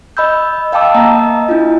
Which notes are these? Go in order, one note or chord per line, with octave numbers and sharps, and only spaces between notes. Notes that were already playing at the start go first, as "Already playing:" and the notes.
D#5 B5 E6 G6
D#5 F5 G5 A5 D6 E6
A#3 D#5 A#5
D4 E4 F4